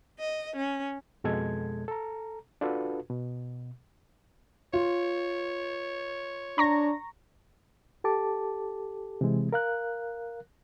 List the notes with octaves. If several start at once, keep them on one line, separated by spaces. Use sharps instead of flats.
D#5
C#4
F2 B2 G#3 A4 G#6
A4 A#5
D4 F4 F#4 A4 B4
B2
F4 C#5
D4 A#5 C#6 A#6
G4 A4 A5 D6
C3 E3 G#3 C4
A#4 F5 F#6